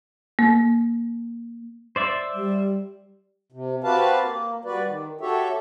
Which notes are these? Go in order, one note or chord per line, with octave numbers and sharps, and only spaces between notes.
A#3
C5 D5 E5
G3
C3
C4 F#4 G4 B4 F5 A5
A#3
G3 F#4 B4 D5
D#3
F#4 G4 A4 C#5 E5